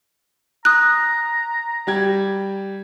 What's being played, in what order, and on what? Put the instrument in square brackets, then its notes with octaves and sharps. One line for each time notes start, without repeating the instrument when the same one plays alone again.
[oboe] A#5 [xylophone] D#6 F#6
[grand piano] G3 G4 G#6